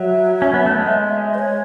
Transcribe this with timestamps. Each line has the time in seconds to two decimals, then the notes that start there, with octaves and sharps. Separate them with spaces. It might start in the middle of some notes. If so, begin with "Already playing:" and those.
Already playing: F#3 E5
0.42 C#4
0.54 B3
0.66 A3
0.78 G#3
1.34 B4
1.39 C#5